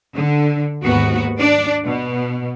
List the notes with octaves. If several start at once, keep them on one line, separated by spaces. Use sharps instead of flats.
D3
D#2 G#2 B3 F#4
D4 D5
B2